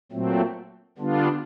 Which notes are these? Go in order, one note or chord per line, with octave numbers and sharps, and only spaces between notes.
A#2 F#3 A3 C4
D3 G3 B3 D4 F4